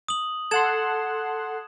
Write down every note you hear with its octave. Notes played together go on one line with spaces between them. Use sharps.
D#6 F#7
A4 F#5 C6 G#6 E7